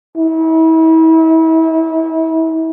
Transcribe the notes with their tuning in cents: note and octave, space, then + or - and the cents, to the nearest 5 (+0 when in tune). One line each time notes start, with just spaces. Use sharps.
E4 -35